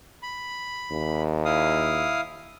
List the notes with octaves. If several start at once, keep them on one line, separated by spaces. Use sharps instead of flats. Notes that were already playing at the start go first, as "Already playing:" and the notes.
B5
D#2
E4 F5 D#6